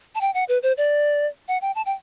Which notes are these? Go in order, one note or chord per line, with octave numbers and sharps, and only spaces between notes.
A5
G5
F#5
B4
C5
D5
F#5
G5
A5
G5